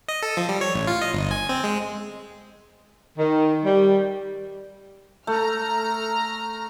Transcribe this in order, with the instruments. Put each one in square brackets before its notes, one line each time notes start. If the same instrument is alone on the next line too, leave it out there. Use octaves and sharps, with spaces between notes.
[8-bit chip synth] D#5
A4
F3
G3
C#5
A1
F4
D#5
G1
G#5
C4
G#3
[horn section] D#3
G3
[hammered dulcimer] A3 [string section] A#5 F6